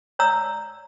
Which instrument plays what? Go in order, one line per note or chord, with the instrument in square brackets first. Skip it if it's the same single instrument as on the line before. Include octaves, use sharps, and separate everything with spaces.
[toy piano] C#5 D5 A#5 E6